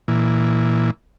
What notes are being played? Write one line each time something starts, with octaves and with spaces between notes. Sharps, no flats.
A#2 E3